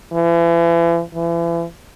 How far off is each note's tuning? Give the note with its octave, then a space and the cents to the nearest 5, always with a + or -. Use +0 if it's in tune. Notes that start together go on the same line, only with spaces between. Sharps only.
E3 +40
E3 +40